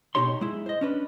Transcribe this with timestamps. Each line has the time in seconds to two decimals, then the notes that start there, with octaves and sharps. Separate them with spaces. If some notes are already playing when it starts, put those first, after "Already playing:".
0.15 B2 D#3 D#4 G4 C#5 C6
0.41 G#3 E4
0.66 C5 D#5
0.81 C#4 D4 B4